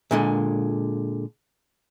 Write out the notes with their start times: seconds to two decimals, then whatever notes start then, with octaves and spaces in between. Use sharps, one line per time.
0.11 A#2 D3 G#3